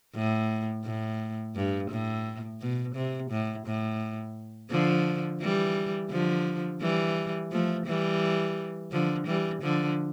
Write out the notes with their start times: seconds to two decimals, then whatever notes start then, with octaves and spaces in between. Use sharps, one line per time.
0.15 A2
0.85 A2
1.56 G2
1.91 A2
2.61 B2
2.95 C3
3.31 A2
3.66 A2
4.71 D3 F3
5.41 E3 G3
6.11 D3 F3
6.81 E3 G3
7.52 F3 A3
7.86 E3 G3
8.92 D3 F3
9.27 E3 G3
9.62 D3 F3